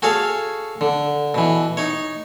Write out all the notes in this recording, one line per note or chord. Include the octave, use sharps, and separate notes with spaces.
F#4 G#4 A4 C#5 F5
D3
B2 E3
D#4 C#5